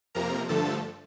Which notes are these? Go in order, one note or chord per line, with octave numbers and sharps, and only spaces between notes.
F2 C3 F3 A#3 A#4 A#5
G2 D3 F3 A3 A4 A5